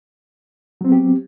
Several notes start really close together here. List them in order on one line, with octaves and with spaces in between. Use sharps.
F#3 C4 B3 G4